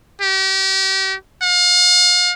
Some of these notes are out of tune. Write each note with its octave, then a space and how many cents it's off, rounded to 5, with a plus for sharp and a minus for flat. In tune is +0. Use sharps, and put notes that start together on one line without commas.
G4 -35
F5 +40